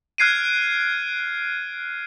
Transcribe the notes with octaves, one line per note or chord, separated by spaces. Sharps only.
F6 F#6 G#6 C7 D7 D#7